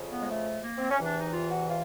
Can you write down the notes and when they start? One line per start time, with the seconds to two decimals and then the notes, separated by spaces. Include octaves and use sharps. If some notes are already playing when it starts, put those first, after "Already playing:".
Already playing: F2 C#3 F3
0.11 B3
0.21 G#3
0.28 A3
0.62 A#3
0.77 C4
0.90 C#4
0.99 E2 C3 E3 D4
1.15 D#4
1.33 F4
1.51 F#4
1.69 F4